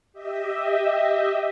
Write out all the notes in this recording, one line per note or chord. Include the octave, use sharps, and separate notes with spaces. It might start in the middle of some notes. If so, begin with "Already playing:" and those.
G4 D#5 E5